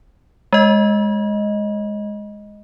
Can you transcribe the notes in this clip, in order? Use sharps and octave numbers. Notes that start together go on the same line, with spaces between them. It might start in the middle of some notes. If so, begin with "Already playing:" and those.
G#3 D#5